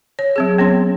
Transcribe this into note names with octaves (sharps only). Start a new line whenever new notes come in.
C#5
F#3 C4 G#4
B3 C#4 C#5 C6